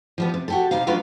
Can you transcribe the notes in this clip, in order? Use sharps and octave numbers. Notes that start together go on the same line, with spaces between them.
F3 G3 B3
C3
F#4 G4 A4
C3 G3 D#4 F5
F#3 A3 D4 F4 B4 F5